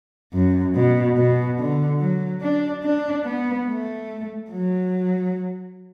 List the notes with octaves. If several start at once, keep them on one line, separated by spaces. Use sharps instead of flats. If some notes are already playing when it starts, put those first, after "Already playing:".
F#2
B2
B2
D3
F#3
D4
D4
B3
A3
F#3